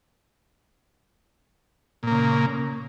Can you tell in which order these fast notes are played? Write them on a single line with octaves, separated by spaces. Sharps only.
A#2 A#3 C#3